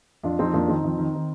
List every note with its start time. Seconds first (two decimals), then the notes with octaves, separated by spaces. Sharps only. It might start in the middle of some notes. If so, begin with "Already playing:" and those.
0.23 F2 D4 F4
0.39 F2 C4 D#4
0.53 F2 A#3 D4
0.68 D#3 C4 D#4
0.84 F2
0.98 D#3
1.14 D#3